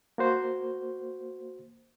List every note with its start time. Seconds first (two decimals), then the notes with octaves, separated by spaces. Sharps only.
0.18 A#3 F#4 C5